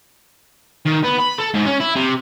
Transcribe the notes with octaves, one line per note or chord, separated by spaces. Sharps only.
D#3
B3
B5
A4
G#2
C#4
E4
C3